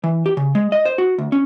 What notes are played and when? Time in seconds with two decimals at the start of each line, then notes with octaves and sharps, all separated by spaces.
0.04 E3
0.26 G4
0.37 C#3
0.55 G#3
0.72 D#5
0.85 C5
0.98 F#4
1.18 D2
1.32 C#4